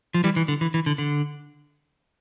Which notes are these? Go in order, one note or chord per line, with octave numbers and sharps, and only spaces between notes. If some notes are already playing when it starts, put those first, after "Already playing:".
F3
E3 G3
E3
D3
E3
E3
D3
D3